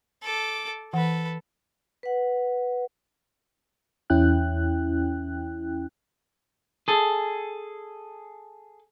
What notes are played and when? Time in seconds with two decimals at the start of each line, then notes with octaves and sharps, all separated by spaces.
0.23 A4 D6
0.93 E3 A4 B4 F#5
2.03 B4 F#5
4.10 E2 C#4 E4 G5 F#6
6.88 G#4 A4